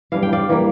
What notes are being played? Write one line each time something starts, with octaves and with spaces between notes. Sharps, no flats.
E3 G3 D4 F5
G5
D5 F5
E3 G3 A#3